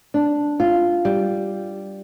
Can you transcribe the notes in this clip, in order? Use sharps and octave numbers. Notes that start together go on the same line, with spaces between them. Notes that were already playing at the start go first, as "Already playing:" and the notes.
D4
F4
G3